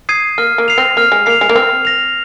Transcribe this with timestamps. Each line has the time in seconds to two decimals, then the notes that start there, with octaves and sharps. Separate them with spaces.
0.09 D#6 G#6 C7 D#7
0.38 A#3 F6
0.58 A#3
0.68 C7 F7
0.78 C4
0.97 A#3 F6
1.12 G#3
1.26 A#3 C7 F7
1.41 G#3
1.49 A#3
1.56 C4 F6
1.85 A#6 F7